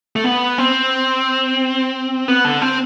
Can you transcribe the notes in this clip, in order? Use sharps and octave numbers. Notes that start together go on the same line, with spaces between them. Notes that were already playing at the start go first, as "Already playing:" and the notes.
A3
B3
C4
B3
D3
C4